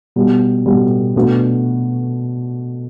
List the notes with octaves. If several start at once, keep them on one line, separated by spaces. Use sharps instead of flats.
B2 G3 B3
B2 G3 B3
B2 A3 D4 F#4 B4